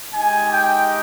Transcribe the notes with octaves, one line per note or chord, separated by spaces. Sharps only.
G#3 D#4 G4 G#5
G5